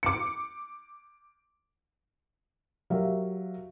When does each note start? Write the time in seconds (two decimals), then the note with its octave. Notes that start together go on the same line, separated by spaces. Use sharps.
0.03 D6 C#7
2.90 F#3 G4 A#4 E5 F5